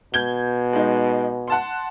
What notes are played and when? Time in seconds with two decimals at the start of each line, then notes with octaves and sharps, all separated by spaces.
0.14 B2 G6 G#6 G7
0.73 G#3 D#4
1.48 F#5 A5 C6